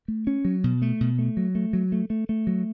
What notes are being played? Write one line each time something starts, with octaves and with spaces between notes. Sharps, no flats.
A3
C#4
F#3
B2
A3
B2
A3
F#3
A3
F#3
A3
A3
A3
F#3